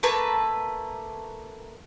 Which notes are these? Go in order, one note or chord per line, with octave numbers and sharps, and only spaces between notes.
A3 A#3 B4 A5